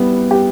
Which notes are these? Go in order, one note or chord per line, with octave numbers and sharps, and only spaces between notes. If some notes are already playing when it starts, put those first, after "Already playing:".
Already playing: G3 B3 E4
G4